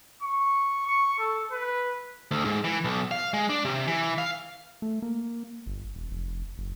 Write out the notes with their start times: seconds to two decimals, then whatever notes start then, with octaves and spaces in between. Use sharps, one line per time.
0.23 C#6
0.87 C#6
1.19 A4
1.52 B4
2.31 D2
2.45 G#2
2.64 E3
2.84 B1
3.11 F5
3.33 G#3
3.50 D4
3.65 C3
3.88 E3
4.18 F5
4.82 A3
5.02 A#3
5.66 G1
5.95 E1
6.11 F1
6.58 F#1